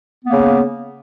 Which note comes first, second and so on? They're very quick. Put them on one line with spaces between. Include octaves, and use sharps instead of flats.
B3 A#3 C#3